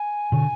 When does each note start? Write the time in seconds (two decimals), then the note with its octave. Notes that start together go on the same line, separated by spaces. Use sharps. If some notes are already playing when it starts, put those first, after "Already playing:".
Already playing: G#5
0.32 B2 D3